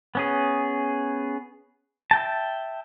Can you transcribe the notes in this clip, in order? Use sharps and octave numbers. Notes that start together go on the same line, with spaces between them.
B3 C#4 G#4
E5 G5 A5